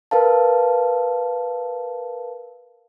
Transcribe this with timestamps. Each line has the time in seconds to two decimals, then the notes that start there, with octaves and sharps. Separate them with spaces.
0.11 A#4 B4 F5 A5